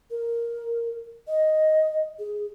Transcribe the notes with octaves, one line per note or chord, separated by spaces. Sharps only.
A#4
D#5
G#4